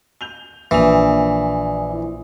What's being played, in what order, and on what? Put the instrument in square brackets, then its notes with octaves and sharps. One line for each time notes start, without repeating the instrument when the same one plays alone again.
[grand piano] G6 F7 G7
[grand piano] A#1 F7 [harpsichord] E3 [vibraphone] D5 G#5 D#6
[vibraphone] E4